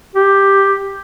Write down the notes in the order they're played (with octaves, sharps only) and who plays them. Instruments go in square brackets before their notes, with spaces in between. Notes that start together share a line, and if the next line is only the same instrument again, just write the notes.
[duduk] G4